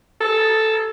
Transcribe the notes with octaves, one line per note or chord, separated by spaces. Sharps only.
A4